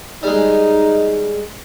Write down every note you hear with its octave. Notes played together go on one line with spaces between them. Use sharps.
G3 G#3 D#4